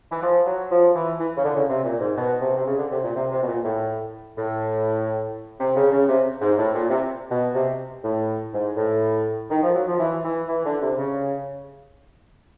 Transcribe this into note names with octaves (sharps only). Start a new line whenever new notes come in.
E3
F3
F#3
F3
E3
E3
C#3
D3
C#3
C3
A#2
G#2
B2
C3
C3
C#3
D3
C3
A#2
C3
C3
B2
A#2
A2
A2
C3
C#3
C#3
C3
G#2
A2
A#2
C3
B2
C3
A2
G#2
A2
D#3
F3
F#3
F3
E3
E3
E3
D3
C3
C#3